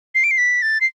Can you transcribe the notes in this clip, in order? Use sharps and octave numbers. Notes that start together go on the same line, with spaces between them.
C7
D7
C7
B6
A6
C7